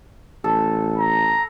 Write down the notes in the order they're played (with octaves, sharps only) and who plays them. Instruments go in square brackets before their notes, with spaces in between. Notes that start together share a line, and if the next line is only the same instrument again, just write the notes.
[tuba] A1 [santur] A4
[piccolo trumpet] A#5